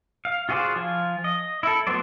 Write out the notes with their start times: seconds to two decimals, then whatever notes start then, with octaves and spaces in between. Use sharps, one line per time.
0.25 F5
0.49 F4 F#4 G#4 C5 D5
0.76 F3 F4 G#5
1.24 D#5
1.63 E4 A4
1.87 F#3 A3 B3 C5 D5